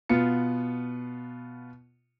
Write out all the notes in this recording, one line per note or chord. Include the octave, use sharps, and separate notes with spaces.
B2 B3 F4 C#7